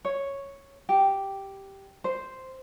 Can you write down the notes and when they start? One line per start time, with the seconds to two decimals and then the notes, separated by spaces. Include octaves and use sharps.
0.05 C#5
0.89 G4
2.04 C5